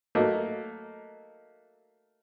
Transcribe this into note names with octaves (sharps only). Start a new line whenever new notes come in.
F#3 A3 A#3 D#4